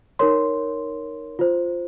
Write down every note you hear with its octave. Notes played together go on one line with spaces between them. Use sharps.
D#4 A#4 C#5 C6
F4 C5